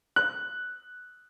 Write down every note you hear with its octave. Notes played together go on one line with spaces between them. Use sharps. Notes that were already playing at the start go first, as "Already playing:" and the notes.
F#6